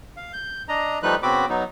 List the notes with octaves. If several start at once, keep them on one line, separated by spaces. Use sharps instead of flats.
F5
G6
D4 D#5 A#5
F3 G3 A3 D#4 B4 F#6
C#3 B3 C4 F#4 B5 D6
F#3 B3 D#4